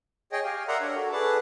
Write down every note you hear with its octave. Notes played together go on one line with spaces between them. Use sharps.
G#4 C#5 D#5 G5
G4 F5 G#5
A#4 D5 E5 F#5 A#5 C6
D4 C#5
F#4 A4
G#4 A4 B4 D5 A5